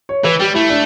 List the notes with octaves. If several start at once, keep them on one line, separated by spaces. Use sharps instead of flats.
C#5
E3 B4
G3 G4
A3 E4
D4